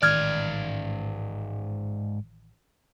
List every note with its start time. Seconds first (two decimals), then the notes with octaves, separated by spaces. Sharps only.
0.03 A1 G#2 D#3 D5 F6 G#6